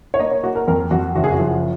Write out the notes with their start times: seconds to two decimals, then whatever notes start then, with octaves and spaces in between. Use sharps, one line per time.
0.14 C#5
0.19 A#3 D#5
0.31 C#5
0.44 A#3 F#4
0.55 A#4
0.68 F2 A#4
0.91 F2 F#4
1.15 F#1 F#4
1.24 G#4
1.32 F#4
1.40 F3